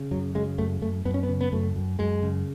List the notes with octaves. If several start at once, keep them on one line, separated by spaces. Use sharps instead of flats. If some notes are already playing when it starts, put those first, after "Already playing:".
Already playing: C#3
F#2 F#3
C#3 G#3
F#2 A3
F#2 A3
F#2 B3
C#4
B3
C#3
B3
F#2 A3
F#2
F#2 G#3
C#3